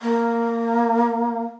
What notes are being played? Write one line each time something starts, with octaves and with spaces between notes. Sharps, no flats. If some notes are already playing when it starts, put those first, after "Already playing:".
A#3